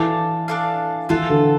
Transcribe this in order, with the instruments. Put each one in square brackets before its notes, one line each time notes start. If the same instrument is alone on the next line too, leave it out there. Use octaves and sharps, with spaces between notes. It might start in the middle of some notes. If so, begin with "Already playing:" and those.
Already playing: [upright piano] E3 [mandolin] D4 A4 D5 F5
[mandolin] D4 A4 D5 F5
[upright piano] E3 [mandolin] B3 F4 A4
[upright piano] D3